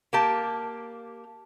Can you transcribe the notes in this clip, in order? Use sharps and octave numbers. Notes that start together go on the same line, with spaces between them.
A#3 G4 A5